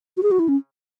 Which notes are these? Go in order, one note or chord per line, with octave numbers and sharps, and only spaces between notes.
F#4
G#4
F#4
E4
C#4